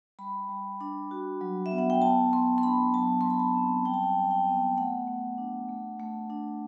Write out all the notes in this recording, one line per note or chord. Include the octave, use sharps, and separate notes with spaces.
G3 B5
G3
D4
F#4
F#3
E5
B3
F#5
G5
B3 A5
B3 C6
C6
D4 B5
F#3 A5
F#3 C6
B5
A5
C4
G3 G5
A5
G5
G3
G5
B3
A3 F#5
A3
D4
A3
A3
D4